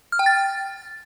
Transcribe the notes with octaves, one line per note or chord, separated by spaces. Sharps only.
F6
G5
A6